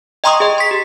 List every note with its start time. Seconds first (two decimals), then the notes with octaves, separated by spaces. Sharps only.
0.24 D#5 G5 A#5 C6 C#6 D#6
0.40 G#4 D#5
0.58 C6 B6
0.71 G4